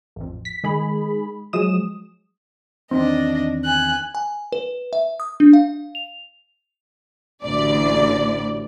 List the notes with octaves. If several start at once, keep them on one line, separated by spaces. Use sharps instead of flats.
A1 F2
B6
D#3 G#3 G#4 B5
F3 F#3 G#3 D#6 E7
E2 D#3 C4 D4 D#5
G#5 F#6
G#5
B4
E5
D#6
D4
F5
F7
A1 D2 A2 D5